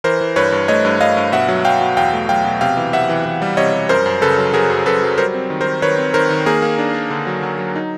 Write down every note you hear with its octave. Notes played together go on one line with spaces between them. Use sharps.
E3 A#4 C5
E3
G2 B4 C#5
G2
A3 C#5 D#5
G2
G2 D#5 F5
G2
B2 E5 F#5
F#3
F#3 F5 G5
B2
E2 F5 G5
A3
F#3 F5 G5
B2
C3 F5 G5
E3
C3 E5 F#5
E3
E3
G3
C3 C#5 D#5
G3
F#2 A#4 C5
F#2
C#3 A4 B4
F#3
F#3 G#4 A#4
F#2
F#2 A4 B4
F#3
G3 A#4 C5
C4
D#3
A#4 C5
D#3
D#3 B4 C#5
C4
D#3 A#4 C5
D#3
A#3 G#4 A#4
A#3
D4
D4
D3
F#3
F#3
F#3
D#4